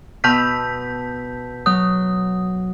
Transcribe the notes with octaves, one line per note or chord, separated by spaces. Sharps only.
B2 A5 E6 F6 G6 B6
F#3 D#6